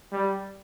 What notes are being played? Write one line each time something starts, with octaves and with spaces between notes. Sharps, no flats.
G3